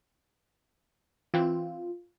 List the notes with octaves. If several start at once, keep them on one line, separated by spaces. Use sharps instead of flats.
E3 C4 F4